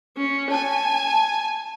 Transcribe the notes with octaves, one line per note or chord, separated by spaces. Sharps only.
C#4
G#5 A5